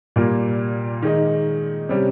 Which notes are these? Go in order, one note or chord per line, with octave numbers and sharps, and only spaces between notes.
A#2 G3 A#3 F4
D#3 G#3 D#4
C3 G3 C#4 G4